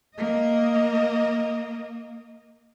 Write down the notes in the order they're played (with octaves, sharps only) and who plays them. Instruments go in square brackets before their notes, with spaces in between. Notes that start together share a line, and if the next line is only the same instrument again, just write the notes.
[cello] A#3 D#5